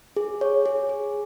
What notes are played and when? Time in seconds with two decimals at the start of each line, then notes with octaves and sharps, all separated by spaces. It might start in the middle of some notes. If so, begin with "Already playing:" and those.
0.16 G#4
0.41 C#5
0.66 G#4
0.89 G#4